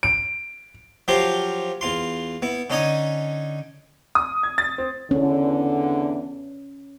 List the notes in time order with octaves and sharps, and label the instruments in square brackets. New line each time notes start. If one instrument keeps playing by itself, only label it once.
[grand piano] D7
[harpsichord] F3 F#3 F4 G4 C5 F5
E2 F4 C6
B3 E4
D3 C#4 D#4 D#5 G#5 D#6
[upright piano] D#6
G#6
A6
C4
[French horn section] E2 D3 [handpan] C#4